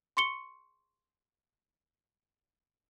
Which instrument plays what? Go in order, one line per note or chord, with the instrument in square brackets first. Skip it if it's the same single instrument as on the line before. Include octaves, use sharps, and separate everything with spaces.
[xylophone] C6 C#6 C#7 G7